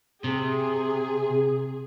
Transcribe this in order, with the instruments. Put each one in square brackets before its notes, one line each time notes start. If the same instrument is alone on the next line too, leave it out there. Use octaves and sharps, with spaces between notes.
[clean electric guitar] C3 [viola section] G#4